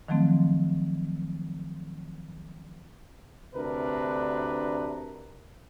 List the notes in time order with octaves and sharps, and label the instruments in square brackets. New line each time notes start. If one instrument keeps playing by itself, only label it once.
[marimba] D#3 F3 F#3 A3 C4
[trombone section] D2 C3 D4 A#4 B4